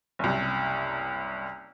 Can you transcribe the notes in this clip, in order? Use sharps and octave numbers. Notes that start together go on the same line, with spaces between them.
F#1 C2